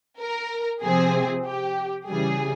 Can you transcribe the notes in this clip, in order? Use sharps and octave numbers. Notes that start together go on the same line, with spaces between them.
A#4
C3 F3 C4 G#4
G4
C#3 E3 G3 G#4